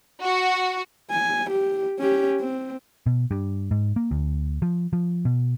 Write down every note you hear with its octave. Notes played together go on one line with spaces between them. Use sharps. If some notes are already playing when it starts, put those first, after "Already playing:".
F#4
G#5
G4
C#4 G4
C4
B2
G2
G#2
A#3
D2
F3
F3
B2